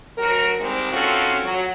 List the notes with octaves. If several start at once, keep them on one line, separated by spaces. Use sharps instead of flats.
D2 F#3 F#4 A#4
G#2 D#3 G3 G#3 A#3 C4
D#3 C4 C#4 F4 F#4 A4
F#3